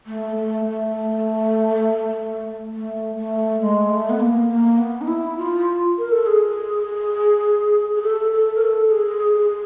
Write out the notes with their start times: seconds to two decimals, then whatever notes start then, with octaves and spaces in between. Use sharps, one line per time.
0.07 A3
0.36 A3
0.65 A3
2.72 A3
3.17 A3
3.61 G#3
3.89 A3
4.10 B3
4.20 A#3
4.49 A#3
4.78 B3
5.01 D#4
5.07 E4
5.38 F4
5.98 A#4
6.12 A4
6.26 G#4
7.95 G#4
8.02 A4
8.32 A4
8.55 A#4
8.62 A4
8.91 G#4
9.35 G#4